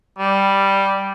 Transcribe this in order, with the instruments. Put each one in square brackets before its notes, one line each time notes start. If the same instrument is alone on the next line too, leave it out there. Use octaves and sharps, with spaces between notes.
[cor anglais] G3